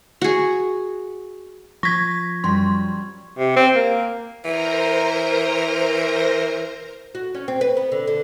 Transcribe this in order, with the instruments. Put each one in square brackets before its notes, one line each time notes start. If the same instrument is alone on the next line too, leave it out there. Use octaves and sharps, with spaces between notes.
[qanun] F#4 G#4
[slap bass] F3 [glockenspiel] C#6 G#6 [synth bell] A#6 B6
[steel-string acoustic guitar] F#2 G3 [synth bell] C6
[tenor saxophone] C3
C4
A#3
[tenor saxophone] E3 [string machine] A#4 C5 A#5
[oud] F#4
C#4
C4
B4
B3
D3
D3